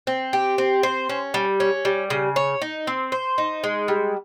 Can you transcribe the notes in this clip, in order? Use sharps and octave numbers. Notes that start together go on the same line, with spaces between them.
C4
G4
C4
C5
C#4
G3
C#4
G3
C#3
C#5
D#4
C4
C5
D#4
G#3
G3